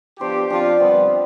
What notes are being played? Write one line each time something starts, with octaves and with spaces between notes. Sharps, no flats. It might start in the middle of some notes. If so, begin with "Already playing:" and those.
F3 B3 D4 G4 C5
F3 C4 D4 F4
D3 G3 B3 C4